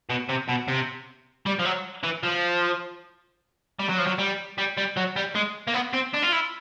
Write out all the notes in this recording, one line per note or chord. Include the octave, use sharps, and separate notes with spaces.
B2
C3
B2
C3
G3
F3
F#3
E3
F3
G3
F#3
F3
F#3
G3
G3
G3
F#3
G3
G#3
A#3
B3
C4
D4
F4
E4